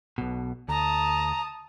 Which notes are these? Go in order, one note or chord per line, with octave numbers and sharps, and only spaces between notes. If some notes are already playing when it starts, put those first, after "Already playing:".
B1 B2
D2 A5 A#5 D#6